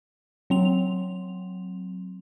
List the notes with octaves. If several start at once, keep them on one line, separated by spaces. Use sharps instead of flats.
F#3 C4 F7